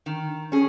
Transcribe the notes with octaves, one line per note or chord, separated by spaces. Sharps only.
D#3
C#4 G#4